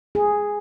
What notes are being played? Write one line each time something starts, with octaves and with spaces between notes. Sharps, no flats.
G#4